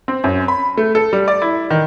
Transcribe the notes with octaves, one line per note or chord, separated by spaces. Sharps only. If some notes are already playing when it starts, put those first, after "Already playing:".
C4
F#2
B5
A3
A4
G3
D5
E4
D#3